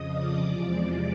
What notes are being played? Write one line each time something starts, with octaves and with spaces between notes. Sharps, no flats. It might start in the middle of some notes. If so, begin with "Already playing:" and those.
Already playing: F2 C#3 F3 D#5 D#6
D5 D6
E2 C3 F3 G#3